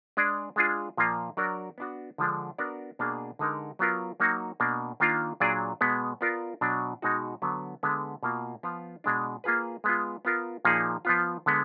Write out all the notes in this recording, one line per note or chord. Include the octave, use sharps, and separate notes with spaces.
G#3 D4 G#4 D5
G#3 D4 F4 G#4
A#2 F3 A#3 F4
F#3 D4 F#4 A#4 D5
B3 D4 F#4
D3 F3 G#3 D4
B3 D4 F#4 A#4 D5
B2 A#3 D4 G#4
D3 G#3 D#4 A#4
F#3 B3 F4 A#4
F#3 A#3 D#4 F#4
B2 A#3 D4
D#3 A#3 D4 F4
A#2 F#3 D4 G#4 D5
B2 G#3 B3
B3 F4 A#4 D5
B2 F#3 D4
B2 G#3 D#4 F#4
D3 F#3 B3
D3 G#3 B3
B2 A#3 F4
F3 B3 F4
B2 G#3 D4
A#3 F4 G#4 B4
G#3 B3 F4
B3 F4 A#4
A#2 F3 A#3 D#4 G#4
F3 B3 F4
D3 G#3 B3